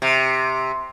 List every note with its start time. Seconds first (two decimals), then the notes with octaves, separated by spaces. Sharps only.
0.02 C3